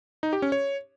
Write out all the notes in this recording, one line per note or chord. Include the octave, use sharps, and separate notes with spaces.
D#4
G4
C#4
C#5